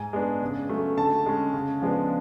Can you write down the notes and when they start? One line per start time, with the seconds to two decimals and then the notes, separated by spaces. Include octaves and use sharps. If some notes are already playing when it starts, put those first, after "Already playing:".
Already playing: G#2 G#5
0.13 G#3 B3 D4
0.41 C#3
0.69 F#3 A3 C#4
0.98 D3 A5
1.26 G#3 C#4
1.54 C#3
1.82 F3 G#3 B3 D4